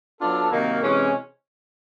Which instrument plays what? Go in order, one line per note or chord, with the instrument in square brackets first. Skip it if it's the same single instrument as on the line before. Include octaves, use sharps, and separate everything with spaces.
[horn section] F#3 B3 D4 F4 A4
C3 D#3 F#3 A#3
C3 E3 G#3 C#4